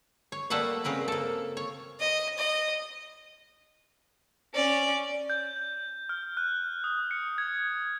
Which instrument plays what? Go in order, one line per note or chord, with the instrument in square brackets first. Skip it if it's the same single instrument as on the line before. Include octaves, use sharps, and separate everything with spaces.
[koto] C#5
G3 A3 A#3 A4 B4 F#5
C#3 C4 A#4 B4
A#3 A4
C#5
[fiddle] D#5
D#5
[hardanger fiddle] C#4 D5
[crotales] G6
F6
F#6
D#6
C#7
G#6